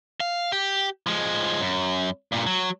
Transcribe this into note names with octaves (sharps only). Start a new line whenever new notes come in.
F5
G4
F3 G#3
F#2
G2 A#2
F#3